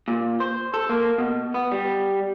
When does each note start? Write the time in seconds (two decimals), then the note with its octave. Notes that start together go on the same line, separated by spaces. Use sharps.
0.08 A#2
0.40 C5
0.74 A4
0.89 A#3
1.18 B2
1.54 B3
1.72 G3